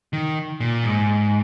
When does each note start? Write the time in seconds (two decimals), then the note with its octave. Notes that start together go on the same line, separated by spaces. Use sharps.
0.13 D#3
0.60 A#2
0.84 G#2